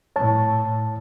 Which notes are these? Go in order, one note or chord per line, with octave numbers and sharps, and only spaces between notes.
A2 C#5 A5